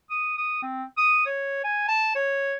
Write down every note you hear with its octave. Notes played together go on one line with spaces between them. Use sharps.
D#6
D#6
C4
D#6
C#5
G#5
A5
C#5